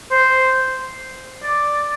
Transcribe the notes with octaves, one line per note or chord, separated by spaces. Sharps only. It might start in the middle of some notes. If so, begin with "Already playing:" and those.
C5
D5